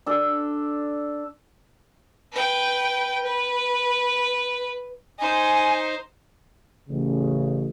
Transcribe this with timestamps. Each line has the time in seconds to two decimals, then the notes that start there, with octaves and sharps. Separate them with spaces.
0.06 D4 A4
2.32 B4 G5
3.23 B4
5.19 D#4 C5 G#5
6.88 A1 C#3